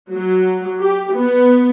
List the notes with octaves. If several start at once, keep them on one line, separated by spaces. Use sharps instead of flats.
F#3
G4
B3